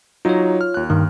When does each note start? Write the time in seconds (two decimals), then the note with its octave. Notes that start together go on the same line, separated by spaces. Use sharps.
0.25 F#3 D#4 F4 C#5
0.61 F6
0.74 D#2 F#6
0.90 G2 D#3